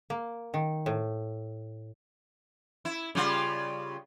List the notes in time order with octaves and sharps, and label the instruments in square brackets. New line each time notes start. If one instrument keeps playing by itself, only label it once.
[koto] A#3
D#3
A2
[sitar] E4
C#3 G3 F4